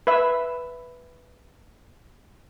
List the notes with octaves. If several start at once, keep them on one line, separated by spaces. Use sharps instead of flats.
B4 E5